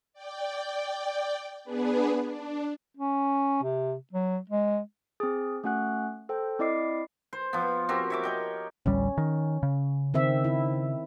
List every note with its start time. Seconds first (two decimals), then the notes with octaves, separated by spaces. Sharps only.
0.13 D5 G5
1.64 B3 D4 G#4 B4
2.26 D4
2.97 C#4
3.63 C3
4.13 F#3
4.50 G#3
5.20 C4 G#4
5.64 A3 C#4 F#4 F#5 F#6
6.29 A4 C5 G5
6.59 C4 E4 D5 D#5 D6 C7
7.33 C5
7.53 F3 B3
7.89 C4 F#4 G4 A#4
8.10 C#5 E5 D6
8.23 A#4 D#5 G5
8.86 A1 D2 G3 C#4
9.18 D#3
9.63 C#3
10.14 D#3 C4 E5
10.44 E4